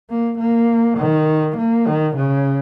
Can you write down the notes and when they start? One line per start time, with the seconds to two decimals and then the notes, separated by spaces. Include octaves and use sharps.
0.10 A#3
0.39 A#3
0.99 D#3
1.57 A#3
1.87 D#3
2.17 C#3